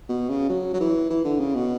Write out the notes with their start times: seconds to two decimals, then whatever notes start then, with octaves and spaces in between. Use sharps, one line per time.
0.09 B2
0.30 C#3
0.50 F#3
0.74 F#3
0.80 E3
1.10 E3
1.24 D3
1.40 C#3
1.55 B2